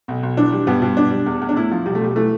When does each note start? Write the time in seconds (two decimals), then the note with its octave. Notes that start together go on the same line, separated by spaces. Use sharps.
0.08 B1
0.23 B1
0.37 E3 D4
0.52 G3
0.67 G2 B3
0.82 G2
0.97 B2 D4
1.12 G3
1.26 E2
1.42 E2
1.49 D4
1.56 A2 E4
1.71 F3
1.86 B1 G3
1.95 A3
2.01 B1 G3
2.16 E3 A3